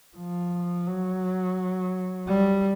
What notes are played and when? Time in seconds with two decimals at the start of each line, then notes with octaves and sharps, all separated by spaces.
0.17 F3
0.87 F#3
2.28 G3